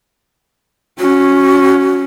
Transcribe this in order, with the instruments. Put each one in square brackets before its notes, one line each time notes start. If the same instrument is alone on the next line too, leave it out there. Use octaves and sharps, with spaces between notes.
[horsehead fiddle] C#4 [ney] F#4